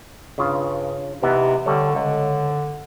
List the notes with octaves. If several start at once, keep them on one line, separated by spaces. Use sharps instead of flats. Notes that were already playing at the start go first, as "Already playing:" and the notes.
G2 C#3 F4
C3 E3 B3 D#4
D3 G3 A3 C#5
C#2 D3